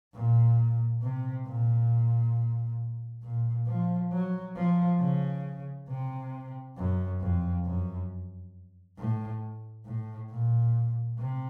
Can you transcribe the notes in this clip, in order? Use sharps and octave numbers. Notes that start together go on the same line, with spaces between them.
A#2
C3
A#2
A#2
F3
F#3
F3
C#3
C3
F#2
F2
F#2
A2
A2
A#2
C3